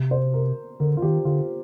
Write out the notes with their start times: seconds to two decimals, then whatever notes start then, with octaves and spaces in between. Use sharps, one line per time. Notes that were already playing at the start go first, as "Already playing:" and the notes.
Already playing: C3
0.11 C5
0.34 A#4
0.80 D3 A#4
0.97 F4
1.02 D#3 G4
1.25 D3 F4